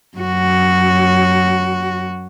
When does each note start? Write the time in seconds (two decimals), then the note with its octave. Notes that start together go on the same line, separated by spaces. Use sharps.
0.17 F#2 F#4